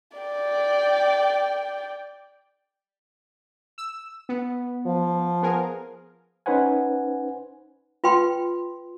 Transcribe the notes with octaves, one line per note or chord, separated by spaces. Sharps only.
D5 G5
E6
B3
F3
B3 G#4 A#4
C#4 D#4 B4 C5 F#5 G#5
F4 B4 G5 C6